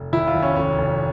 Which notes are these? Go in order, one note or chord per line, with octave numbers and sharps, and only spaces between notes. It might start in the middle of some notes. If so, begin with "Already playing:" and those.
Already playing: F1
G#1 E4
F4
G#1
C#4
F1 C#4
F1